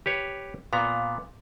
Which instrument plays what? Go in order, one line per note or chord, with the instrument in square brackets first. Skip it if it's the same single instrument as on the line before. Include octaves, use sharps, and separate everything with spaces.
[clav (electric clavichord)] G4 B4 C#5
[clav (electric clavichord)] A#2 B3 A#5 [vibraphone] F5